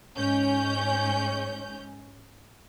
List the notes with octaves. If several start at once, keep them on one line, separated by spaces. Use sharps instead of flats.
G#2 C#4 G6